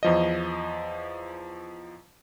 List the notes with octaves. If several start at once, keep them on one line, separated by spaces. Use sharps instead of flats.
E2 F3 D#5